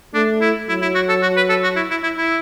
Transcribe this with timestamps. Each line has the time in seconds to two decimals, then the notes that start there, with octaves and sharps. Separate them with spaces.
0.14 A3 D4
0.41 E4
0.68 F#3 E4
0.82 E4
0.95 F#4
1.09 A4
1.22 F#4
1.37 B4
1.49 A4
1.63 F#4
1.76 E4
1.91 E4
2.03 E4
2.18 E4